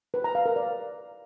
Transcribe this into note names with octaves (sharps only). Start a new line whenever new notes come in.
B4
A#5
F5
A#4
D5